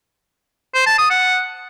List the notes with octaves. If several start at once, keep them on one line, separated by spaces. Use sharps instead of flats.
C5
A5
D#6
F#5